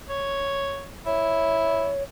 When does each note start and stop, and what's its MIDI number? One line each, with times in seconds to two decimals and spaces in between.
0.09 0.88 73
1.06 1.91 64
1.06 2.03 73